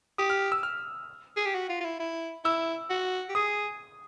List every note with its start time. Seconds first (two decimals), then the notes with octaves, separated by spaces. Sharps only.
0.18 G4 D#6
0.30 F6
0.52 E6
0.63 F6
1.36 G#4
1.45 G4
1.54 F#4
1.69 F4
1.80 F4
1.84 E4
2.00 E4
2.44 E4 E6
2.90 F#4
3.29 G4
3.35 G#4 D#6